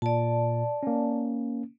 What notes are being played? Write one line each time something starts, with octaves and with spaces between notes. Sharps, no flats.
A#2 D5 A5
A#3 C#4